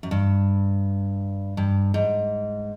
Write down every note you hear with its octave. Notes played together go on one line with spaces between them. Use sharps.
F#2
G2
G2
G#2